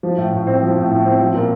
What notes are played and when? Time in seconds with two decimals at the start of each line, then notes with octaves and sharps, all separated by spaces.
0.03 F3
0.18 A2
0.33 A2
0.47 C4
0.62 F3
0.77 A2
0.91 A2
1.05 C4
1.20 F3
1.34 A#2